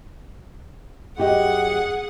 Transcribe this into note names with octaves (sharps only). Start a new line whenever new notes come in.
F#2 G4 G#4 D#5 F#5